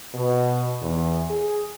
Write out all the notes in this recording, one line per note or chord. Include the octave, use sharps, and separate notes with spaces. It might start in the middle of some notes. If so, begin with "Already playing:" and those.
B2
E2
G#4